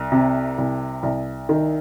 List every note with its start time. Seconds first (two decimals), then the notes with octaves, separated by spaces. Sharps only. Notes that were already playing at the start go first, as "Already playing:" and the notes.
Already playing: C2
0.12 C3
0.58 C2
1.03 C2
1.49 D#3